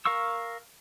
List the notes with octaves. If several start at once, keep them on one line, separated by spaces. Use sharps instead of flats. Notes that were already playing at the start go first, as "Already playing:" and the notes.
A#4 F5 C#6 E6